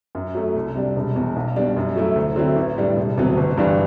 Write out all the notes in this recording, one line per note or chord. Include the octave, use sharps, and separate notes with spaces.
F#2
F#3 A3
C2
C3 G3 D4
E1
E2 B2
B1
B2 G3 D4
F#2
F#3 A3 E4
D2
D3 F#3 C4 E4
A1
A2 G3 D4
E1
D2 C3 F#3 B3
G1
G2 E3 G3 D4